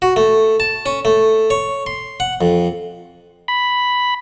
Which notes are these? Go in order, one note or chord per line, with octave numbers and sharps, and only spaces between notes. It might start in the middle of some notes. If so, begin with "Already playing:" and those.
F#4
A3
A5
C#4
A3
C#5
C6
F#5
F2
B5